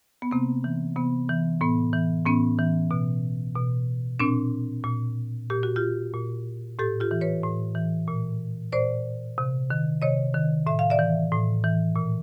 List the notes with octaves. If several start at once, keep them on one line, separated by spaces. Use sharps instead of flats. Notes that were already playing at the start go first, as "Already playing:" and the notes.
B3
C3 A#3 C4
E3
C3 B3
E3
A2 B3
E3
A2 B3 C#4
E3
B2
B2
A#2 C4 D4
A#2
A#2 G4
F#4
F4 G4
A#2
A2 G4 A4
F4 G4
E3
B4 C#5
A2
E3
A#2
A#2 C5 D5
C3
D#3
C3 C#5 D#5
D#3
A2 E5
F5
D5 E5
E3
A2
E3
A#2